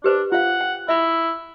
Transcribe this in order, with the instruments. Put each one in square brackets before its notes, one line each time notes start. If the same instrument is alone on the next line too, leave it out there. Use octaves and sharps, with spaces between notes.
[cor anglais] D4 [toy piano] G4 B4 C5
[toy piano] F4 F5 [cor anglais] F#5
[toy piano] G5
[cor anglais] E4 [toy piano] E5 B5